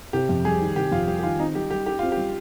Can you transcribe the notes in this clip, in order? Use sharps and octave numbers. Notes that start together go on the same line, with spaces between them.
C3 G4
F2
G3 G#4
D#3
C3 G4
F2 F4
G3 G4
G4
D#3 F4
C4 D#4
G3 G4
G3 G4
D#4 G4
C4 F4
G4
G3